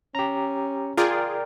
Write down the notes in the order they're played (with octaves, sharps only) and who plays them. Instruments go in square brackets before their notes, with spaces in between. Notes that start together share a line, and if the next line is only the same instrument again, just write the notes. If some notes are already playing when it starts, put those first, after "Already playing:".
[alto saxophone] C#4 [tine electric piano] G4 A#5
[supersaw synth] F4 G#4 [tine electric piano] A#4 D5 G5